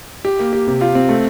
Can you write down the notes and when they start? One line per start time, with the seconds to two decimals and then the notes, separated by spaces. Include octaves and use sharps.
0.25 G4
0.39 A#3
0.53 G4
0.67 C3
0.81 F4
0.95 C4
1.09 A3